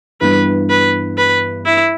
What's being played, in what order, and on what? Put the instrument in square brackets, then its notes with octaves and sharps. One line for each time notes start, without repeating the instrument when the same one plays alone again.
[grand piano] G2 E3 G3 B3 [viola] B4
[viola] B4
B4
E4